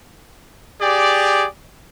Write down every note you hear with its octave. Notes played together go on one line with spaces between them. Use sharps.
G4 G#4 D5